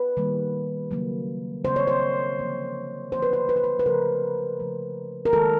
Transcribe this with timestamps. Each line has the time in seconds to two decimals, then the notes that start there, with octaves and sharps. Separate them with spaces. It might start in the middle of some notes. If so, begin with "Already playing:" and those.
Already playing: B4
0.17 D#3 G3 A#3
0.91 C#3 F#3 A#3
1.65 C#3 F#3 A#3 C5
1.76 C#5
1.87 C5
2.39 D3 F3 A#3
3.12 D3 F3 A#3 C5
3.22 B4
3.33 C5
3.49 B4
3.56 C5
3.64 B4
3.79 B4
3.86 C#3 F3 A3 A#4
4.60 C#3 F3 A3
5.26 A#4
5.33 D#3 G#3 A4